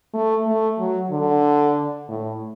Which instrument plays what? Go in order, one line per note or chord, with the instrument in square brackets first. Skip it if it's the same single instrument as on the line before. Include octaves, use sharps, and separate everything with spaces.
[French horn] A3
A3
F#3
D3
A2